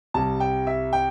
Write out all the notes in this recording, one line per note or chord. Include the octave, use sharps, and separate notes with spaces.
C2 C3 G3 A5
G5
E5
G5